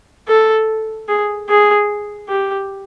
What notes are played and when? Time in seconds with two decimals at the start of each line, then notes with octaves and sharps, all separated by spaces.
0.28 A4
1.08 G#4
1.49 G#4
2.29 G4